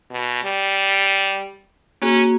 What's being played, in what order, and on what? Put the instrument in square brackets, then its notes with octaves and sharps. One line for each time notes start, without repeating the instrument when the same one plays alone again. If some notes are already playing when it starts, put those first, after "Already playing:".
[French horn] B2
G3
[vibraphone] A#3 F#4 G#4 [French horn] C#4